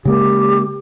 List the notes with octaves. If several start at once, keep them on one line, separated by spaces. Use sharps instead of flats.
C#3 G#3 A#3 G4